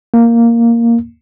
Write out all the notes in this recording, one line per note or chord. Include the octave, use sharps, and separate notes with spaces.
A#3